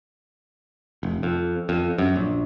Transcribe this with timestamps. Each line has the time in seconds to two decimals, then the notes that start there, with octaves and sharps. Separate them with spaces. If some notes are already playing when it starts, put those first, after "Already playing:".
1.03 F1
1.23 F2
1.69 F2
1.98 F#2
2.16 A#1